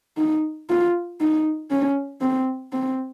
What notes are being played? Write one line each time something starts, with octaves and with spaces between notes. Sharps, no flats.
D#4
F4
D#4
C#4
C4
C4